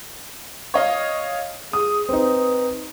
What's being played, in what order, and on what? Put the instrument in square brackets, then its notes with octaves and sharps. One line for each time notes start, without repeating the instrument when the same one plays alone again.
[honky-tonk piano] C#5 D#5 F5
[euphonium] G#4 [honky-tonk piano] D#6
[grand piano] C4 D#4 [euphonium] B4